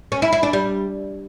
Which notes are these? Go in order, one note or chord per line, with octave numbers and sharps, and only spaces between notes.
C#4
E4
E4
D4
G3